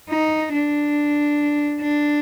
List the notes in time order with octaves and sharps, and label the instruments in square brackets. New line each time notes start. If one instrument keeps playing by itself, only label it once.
[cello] D#4
D4
D4